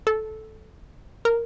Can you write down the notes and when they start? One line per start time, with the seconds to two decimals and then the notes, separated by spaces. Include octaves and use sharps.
0.07 A4
1.25 A#4